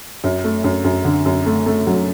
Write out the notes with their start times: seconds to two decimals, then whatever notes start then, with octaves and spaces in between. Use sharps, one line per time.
0.24 F#2
0.44 A3
0.64 F#2
0.85 F#2
1.05 D3
1.26 F#2
1.46 A3
1.66 A3
1.87 F#3